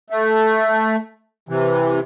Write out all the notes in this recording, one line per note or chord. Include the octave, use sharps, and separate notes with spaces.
A3
C3 E3